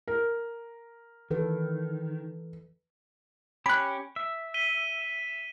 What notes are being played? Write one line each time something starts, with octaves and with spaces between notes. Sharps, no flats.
A#4
D#3 E3 A4 B4
C#4 G4 B5 F#6
E5
B6 D#7 G7